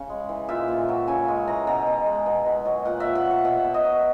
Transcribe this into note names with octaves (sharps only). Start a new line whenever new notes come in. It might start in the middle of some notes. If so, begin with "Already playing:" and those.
Already playing: C#3
G#3
E3
A#2 E5
A#2
F#3
C#3 G#5
G#3
E3 A#5
B2 A#5
B2
G#3
B2
B2
F#3
A#2 F#5
E5
A#2
F#5
F#3 F#5
B2 E5
B2
D#5
F#3